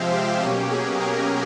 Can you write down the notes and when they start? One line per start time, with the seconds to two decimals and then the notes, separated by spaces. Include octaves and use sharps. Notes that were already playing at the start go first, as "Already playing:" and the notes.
Already playing: C3 F3 G#3 C4 C5 E5 F5
0.12 G4
0.41 B2 F#3 A#3 C#4 G4
0.71 G#4
1.00 A#4